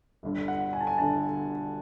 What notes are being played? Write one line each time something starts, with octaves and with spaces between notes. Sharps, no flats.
G1 G2 D3
F#5
G#5
A5
G#5
G1 G2 D3 A5